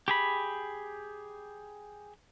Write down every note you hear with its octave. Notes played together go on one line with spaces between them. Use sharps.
G4 G#4 B5